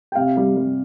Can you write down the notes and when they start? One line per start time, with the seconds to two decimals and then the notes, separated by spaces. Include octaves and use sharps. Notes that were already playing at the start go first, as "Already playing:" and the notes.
0.12 G5
0.15 C3 F5
0.37 G3
0.56 G3